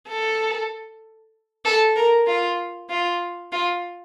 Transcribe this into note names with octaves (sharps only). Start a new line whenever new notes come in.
A4
A4
A#4
F4
F4
F4